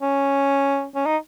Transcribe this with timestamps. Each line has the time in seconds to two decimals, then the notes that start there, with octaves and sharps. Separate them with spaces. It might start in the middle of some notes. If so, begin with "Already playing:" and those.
0.02 C#4
0.95 C#4
1.06 D#4